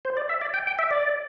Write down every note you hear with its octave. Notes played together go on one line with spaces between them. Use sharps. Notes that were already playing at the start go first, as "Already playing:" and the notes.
C5
D5
E5
D5
G5
G5
E5
D5